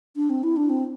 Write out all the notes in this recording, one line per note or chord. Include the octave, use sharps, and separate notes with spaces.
D4
C4
E4
D4
C4